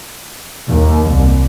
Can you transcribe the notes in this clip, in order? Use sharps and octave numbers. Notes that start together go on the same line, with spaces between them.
D#2
C2